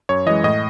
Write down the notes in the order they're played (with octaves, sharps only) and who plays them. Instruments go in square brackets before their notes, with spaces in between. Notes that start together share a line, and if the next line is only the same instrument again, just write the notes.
[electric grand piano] F#2 C#5
E3 G#3 D#5
A2 D#5